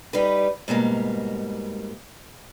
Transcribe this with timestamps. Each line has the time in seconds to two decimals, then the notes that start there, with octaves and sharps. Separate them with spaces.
0.13 G3 D#4 B4
0.68 G#2 B2 G3 A#3